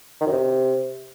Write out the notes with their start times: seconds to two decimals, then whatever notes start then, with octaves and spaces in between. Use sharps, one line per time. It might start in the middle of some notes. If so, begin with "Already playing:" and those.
0.21 D#3
0.26 F#2
0.32 C3